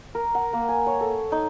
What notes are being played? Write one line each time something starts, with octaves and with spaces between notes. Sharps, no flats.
A#4
F#5
A#3
G#5
C#5
A4
D#4